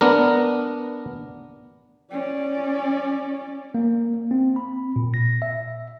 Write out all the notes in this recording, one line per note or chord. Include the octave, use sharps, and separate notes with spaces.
B3 D4 A#4
C#4 D5
A#3
C4
B5
A#2
A#6
E5